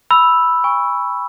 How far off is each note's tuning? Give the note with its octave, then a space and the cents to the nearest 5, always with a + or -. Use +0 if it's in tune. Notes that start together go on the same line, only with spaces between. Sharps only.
B5 +0 E6 +0
G#5 -40 C#6 -5